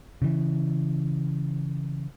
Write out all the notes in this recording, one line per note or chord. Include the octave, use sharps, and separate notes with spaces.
C#3 E3